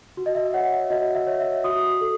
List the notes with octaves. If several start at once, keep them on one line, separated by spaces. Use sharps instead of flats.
F#4
D#5
E5
C#5 F#5
E5
F#4 D#5
E5
C#5
E5
F#4 D#6
A4